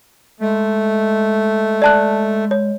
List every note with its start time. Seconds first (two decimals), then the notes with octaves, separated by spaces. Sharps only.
0.40 G#3 A3
1.82 D5 A5 F#6
2.51 C#5